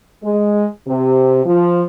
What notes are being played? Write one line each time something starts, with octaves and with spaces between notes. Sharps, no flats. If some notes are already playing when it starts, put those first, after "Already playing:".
G#3
C3
F3